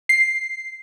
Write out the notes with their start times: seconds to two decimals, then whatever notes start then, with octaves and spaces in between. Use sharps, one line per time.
0.09 C7